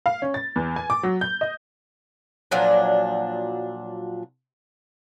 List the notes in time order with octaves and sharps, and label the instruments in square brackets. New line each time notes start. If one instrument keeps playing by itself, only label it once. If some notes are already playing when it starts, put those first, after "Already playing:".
[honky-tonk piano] F5
C#4
A6
E2
G#5
D6
F#3
G6
D#5
[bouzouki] A#2 F3 F#3 D4